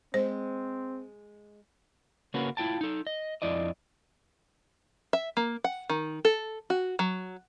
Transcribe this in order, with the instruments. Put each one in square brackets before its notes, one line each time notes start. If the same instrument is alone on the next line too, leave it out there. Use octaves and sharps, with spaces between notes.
[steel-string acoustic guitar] G#3 [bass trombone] C4 [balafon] C5
[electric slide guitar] C#3 A#3 C#4 F#4 B4
E4 F4 G5 A5
D#4 A4
D#5
F2 E4 D5 D#5
[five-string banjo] E5
A#3
F#5
D#3
A4
F#4
F#3